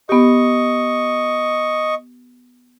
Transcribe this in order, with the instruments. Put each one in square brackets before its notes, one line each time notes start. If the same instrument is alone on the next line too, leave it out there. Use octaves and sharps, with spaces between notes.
[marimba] B3 G4 [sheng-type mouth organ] D#5 C#6